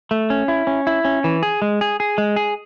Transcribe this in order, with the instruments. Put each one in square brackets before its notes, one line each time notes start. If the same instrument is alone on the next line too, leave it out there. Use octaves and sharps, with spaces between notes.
[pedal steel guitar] A3
C#4
E4
C#4
E4
C#4
E3
G#4
G#3
G#4
G#4
G#3
G#4